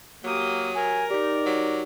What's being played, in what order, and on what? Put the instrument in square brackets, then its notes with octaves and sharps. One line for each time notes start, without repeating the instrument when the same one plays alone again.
[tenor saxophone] F#3 [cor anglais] A#3 [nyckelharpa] G4 D#6
[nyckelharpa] A#4 [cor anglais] G#5
[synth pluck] D#4 G4 [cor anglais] D5
[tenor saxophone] F#3